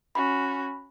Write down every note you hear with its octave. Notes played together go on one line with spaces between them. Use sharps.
C#4 F#4 B5